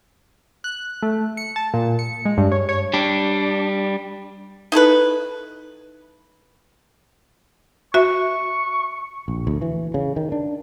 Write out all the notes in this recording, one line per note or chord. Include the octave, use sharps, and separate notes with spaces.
F#6
A3
C#7
A5
A#2
C#7
G#3
G2
C#5
C#5
G3 D4
D#4 E4 A4 B4
F#4 E5 C#6
A#1
D2
E3
C#3
D#3
D4